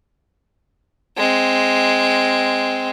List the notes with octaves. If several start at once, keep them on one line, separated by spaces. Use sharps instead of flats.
G#3 C4